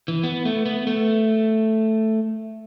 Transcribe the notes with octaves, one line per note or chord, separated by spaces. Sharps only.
E3
B3
A3
B3
A3